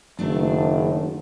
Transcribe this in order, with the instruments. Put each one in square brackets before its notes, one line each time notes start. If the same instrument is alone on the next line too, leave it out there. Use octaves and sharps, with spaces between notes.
[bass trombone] F#1 [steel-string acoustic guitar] D#3 A3 D4